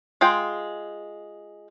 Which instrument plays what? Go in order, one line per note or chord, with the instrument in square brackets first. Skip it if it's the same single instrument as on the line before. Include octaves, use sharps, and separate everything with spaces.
[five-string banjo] G#3 F4 G#4 G5